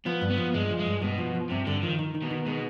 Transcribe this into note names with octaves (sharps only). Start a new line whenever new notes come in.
F3 B3
G2
B3
F3
G2 G#3
F3
G#3
G2
G2 B2
F3
F3
G2 C3
G2 D3
D#3 F3
D#3
D#3
B2
D#3
B2 G#3